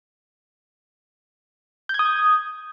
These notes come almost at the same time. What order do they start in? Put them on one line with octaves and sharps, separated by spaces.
G6 G#6 D#6